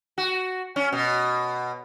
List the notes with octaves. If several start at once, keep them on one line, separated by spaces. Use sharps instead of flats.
F#4
C#4
B2